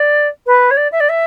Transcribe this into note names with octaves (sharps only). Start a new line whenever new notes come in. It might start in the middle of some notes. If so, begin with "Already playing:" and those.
Already playing: D5
B4
C#5
D5
E5
D5
E5